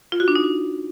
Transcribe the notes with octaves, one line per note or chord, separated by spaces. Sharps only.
F4
F#4
D4
D#4